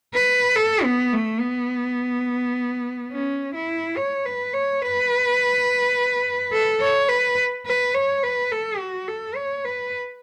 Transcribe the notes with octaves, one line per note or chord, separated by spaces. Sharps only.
B4
A4
B3
A3
B3
C#4
E4
C#5
B4
C#5
B4
A4
C#5
B4
B4
C#5
B4
A4
F#4
A4
C#5
B4